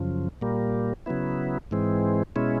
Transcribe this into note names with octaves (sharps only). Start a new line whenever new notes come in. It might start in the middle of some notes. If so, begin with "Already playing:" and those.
Already playing: F#2 C#3 F3
A#2 G3 A#3
C#3 F#3 B3 E4
G#2 E3 G#3 C4
B2 G#3 C#4 E4